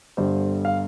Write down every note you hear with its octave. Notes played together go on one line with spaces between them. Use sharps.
G1 G2 D3 C5
F5